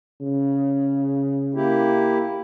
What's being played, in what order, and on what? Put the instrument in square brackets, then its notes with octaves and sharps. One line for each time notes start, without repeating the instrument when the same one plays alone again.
[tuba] C#3
[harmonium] A#3 E4 G4